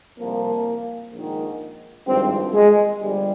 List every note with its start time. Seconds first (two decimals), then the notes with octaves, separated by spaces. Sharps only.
0.18 C2 A#2 F3 A#3
1.13 A#1 G#2 D#3
2.06 G#1 G2 F3 C4
2.53 G#3
3.00 G1 G2 F3 G3